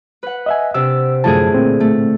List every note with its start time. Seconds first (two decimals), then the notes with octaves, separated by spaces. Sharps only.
0.23 B4 F#5
0.46 D#5 E5 G#5
0.74 C3 D4 E6
1.24 F#2 A2 D3 F3 G#4 A5
1.54 A#2 C4
1.80 A3